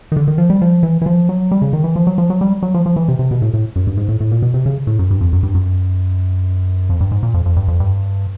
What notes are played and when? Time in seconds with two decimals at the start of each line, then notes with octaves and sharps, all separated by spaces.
0.12 D#3
0.17 D3
0.28 D#3
0.38 F3
0.50 G3
0.62 F3
0.83 E3
1.02 E3
1.06 F3
1.29 F#3
1.51 G3
1.62 C#3
1.73 D#3
1.84 E3
1.96 F3
2.07 F#3
2.18 F3
2.30 F#3
2.41 G3
2.63 F#3
2.74 F3
2.86 F3
2.96 E3
3.08 C3
3.19 C3
3.31 B2
3.42 A2
3.54 A2
3.76 F#2
3.87 G2
3.97 G#2
4.08 A2
4.20 A2
4.32 A#2
4.42 B2
4.54 C3
4.66 C#3
4.87 A2
4.99 F#2
5.11 G2
5.21 F2
5.33 F#2
5.43 G2
5.55 F#2
6.90 F2
7.01 G2
7.12 G#2
7.23 A#2
7.34 F2
7.46 F2
7.56 G2
7.68 F2
7.80 G2